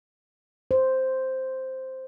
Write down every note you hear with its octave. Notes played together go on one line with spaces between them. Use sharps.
C5